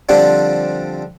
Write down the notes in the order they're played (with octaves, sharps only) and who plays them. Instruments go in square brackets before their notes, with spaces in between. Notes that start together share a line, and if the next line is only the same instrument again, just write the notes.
[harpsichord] D3 F3 G3 C4 D4